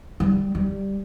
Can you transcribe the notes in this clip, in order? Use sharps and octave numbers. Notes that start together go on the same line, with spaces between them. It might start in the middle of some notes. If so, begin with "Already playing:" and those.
G3
G3